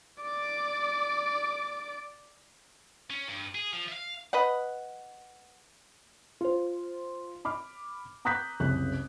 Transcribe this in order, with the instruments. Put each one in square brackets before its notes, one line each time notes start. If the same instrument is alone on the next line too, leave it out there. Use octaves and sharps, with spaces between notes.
[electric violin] D5 D6
[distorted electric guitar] C#4
G2
G#4
F3
E5 F5
[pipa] B4 D#5 F#5
[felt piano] F4 C5
B5 D6 F6
A#5 D#6 F#6 G6 B6
F#1 C2 C#4 F#6